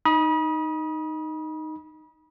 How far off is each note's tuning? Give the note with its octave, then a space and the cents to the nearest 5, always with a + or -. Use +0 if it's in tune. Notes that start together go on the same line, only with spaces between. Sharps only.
D#4 -5 B5 -40 D#6 +5